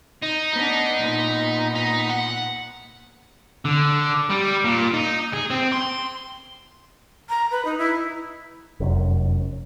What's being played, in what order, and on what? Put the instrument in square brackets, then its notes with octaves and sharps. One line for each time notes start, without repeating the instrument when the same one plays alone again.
[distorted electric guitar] D#4
[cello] B3 D4 [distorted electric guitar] D#4
[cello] A#2 B3
[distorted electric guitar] D#4
F#5
D3
G3
A#2
D#4
G#4
C4
C6
[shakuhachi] A#5
B4
D#4
E4
[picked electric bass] F1 F#2